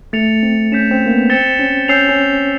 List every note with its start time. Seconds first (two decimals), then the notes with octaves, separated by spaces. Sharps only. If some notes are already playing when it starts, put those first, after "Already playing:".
0.13 A3 A6 C#7 F7
0.43 C4
0.72 C#4 G6 B6 E7
0.91 C4
1.06 A#3
1.11 B3
1.30 C4 A6 C#7 E7 G7
1.60 C#4
1.88 C#4 E6 G6 C7 F7
2.09 C#4